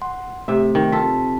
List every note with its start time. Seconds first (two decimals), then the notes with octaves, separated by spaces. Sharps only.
0.01 F#5 C6
0.48 C3 A3 E5
0.75 D#3
0.92 C4 F4 A4 A5 B6